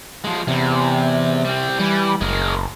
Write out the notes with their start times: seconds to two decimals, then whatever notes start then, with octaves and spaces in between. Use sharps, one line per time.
0.24 F3 G#3
0.47 E2 C3
1.45 G3 C4
1.79 E3 G3
2.21 F#1 G#3 A#4